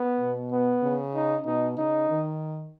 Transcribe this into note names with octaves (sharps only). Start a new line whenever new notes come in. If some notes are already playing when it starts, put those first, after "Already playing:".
Already playing: B3
B2
B3
C#3
D#4
B2 D#4
C#3 D#4
D#3